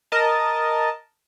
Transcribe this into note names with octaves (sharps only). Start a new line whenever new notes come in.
A#4 D#5 A5